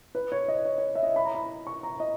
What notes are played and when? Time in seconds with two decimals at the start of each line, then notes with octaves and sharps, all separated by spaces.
0.15 B4
0.32 C#5
0.48 D#5
0.65 C#5
0.78 C#5
0.95 E5
1.03 D#5
1.16 B5
1.25 A#5
1.35 B5
1.67 C#6
1.83 A#5
2.00 D#5